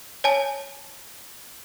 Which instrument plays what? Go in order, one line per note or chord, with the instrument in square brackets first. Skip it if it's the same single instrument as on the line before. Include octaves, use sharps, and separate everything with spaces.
[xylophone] C#5 G#5 A5